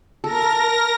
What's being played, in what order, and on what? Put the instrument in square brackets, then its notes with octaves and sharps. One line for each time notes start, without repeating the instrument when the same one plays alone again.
[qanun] A4 [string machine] A#4 A#6